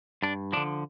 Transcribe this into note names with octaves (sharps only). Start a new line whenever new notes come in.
G2 D4
D3 F3 D4